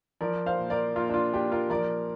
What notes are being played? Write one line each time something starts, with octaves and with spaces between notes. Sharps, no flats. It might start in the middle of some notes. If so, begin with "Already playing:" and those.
F3 A#4 D5
C5 F5
A#2
A#4 D5
A#2 F4 A#4
D4
F4
A#2 D4 G4
F4 A#4
F3 A#4 D5